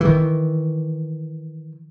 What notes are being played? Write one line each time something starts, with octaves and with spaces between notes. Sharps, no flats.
D#3 E3